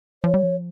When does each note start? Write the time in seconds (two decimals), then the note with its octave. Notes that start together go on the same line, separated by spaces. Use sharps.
0.24 F3 C#5
0.34 G3
0.43 F3